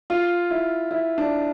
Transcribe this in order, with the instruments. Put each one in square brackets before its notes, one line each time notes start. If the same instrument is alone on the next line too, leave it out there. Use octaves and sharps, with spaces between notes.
[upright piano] F4
E4
E4
D4